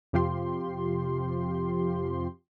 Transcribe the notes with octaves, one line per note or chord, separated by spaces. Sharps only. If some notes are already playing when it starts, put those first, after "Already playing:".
F2 C3 F3 F4 G4 C6